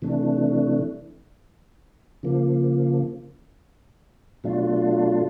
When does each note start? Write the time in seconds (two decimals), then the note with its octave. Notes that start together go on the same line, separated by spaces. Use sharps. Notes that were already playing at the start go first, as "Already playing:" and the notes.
0.02 C3 E3 A3 D4
2.23 C#3 F3 A#3
4.44 B2 F#3 A3 D4 F4